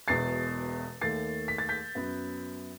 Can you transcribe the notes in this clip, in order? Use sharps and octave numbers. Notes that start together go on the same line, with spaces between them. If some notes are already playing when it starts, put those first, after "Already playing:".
E1 E2 B2 A6 C7
D#2 D#3 A3 A6 C7
B6
A6
G6 B6
F#2 F#3 B3